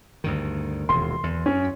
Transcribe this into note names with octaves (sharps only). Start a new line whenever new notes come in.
D2 G2 D#3
E1 D#2 A#2 C6
E2
F#2 C#4